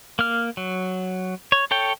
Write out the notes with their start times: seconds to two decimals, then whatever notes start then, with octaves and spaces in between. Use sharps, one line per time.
0.19 A#3 F6
0.57 F#3
1.52 C#5
1.71 A4 C#5 G5